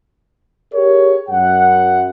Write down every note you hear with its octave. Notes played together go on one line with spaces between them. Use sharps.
G4 G#4 A#4 C#5
F#2 F#5